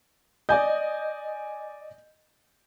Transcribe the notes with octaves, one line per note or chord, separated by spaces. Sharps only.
D5 D#5 G#5 G6